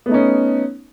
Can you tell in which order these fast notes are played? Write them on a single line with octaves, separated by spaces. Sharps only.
B3 A3 D#4 C#4